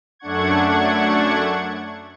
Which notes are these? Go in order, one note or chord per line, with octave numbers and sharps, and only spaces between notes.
F#2 A3 D4 F#5 C#6 G#6